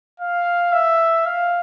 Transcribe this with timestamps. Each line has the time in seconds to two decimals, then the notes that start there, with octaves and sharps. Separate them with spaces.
0.20 F5
0.73 E5
1.26 F5